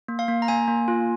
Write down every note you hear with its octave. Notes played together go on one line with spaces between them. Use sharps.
A#3
F5
A#3
A#5
A#3 G#5
A#3
F4